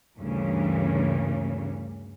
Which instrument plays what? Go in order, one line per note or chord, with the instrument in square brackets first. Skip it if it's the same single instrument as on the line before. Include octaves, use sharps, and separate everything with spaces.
[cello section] D2 G2 A#2 C#3 E3 C#4